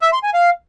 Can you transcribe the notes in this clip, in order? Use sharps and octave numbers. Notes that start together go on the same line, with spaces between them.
E5
C6
G#5
F5